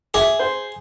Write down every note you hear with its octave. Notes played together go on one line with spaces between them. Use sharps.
G#4 E5 D6
C5